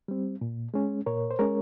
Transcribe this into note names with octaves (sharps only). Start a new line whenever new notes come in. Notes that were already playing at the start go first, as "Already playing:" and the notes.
G3 C4
A#2
G#3 C#4
A#2 A#4 C#5
C5
G#3 C#4 A#4 C#5